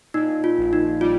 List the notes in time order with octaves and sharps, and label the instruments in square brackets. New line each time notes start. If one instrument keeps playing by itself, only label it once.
[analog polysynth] A#2 [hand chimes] D#4
[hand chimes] F4
[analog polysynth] A#1
[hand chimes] D#4
[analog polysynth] G3 [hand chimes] F4